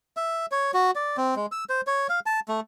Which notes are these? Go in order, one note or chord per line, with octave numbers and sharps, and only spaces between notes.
E5
C#5
F#4
D5
C4
G#3
E6
C5
C#5
F5
A5
A3